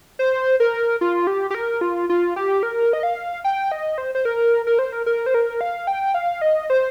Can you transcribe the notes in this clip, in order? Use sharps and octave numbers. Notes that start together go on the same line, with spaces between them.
C5
A#4
F4
G4
G4
A#4
F4
F4
G4
A#4
D#5
F5
G5
D#5
C5
C5
A#4
A#4
C5
A#4
A#4
C5
A#4
F5
G5
F5
D#5
C5